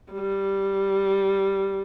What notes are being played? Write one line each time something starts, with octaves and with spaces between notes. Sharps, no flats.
G3